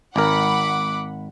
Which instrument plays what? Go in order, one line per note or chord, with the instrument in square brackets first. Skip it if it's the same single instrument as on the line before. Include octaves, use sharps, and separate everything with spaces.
[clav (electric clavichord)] G#1 A#4 [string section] F#5 B5 [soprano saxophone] D6